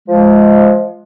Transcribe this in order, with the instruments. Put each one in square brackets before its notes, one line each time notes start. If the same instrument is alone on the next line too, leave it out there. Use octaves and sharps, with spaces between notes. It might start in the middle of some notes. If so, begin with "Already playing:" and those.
[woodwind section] F3 G#3